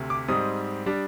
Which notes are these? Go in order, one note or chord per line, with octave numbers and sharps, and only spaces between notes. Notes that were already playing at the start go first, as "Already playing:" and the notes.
Already playing: D2 C3
D6
G#2 G3 C4 D#4 D#6
G3 D4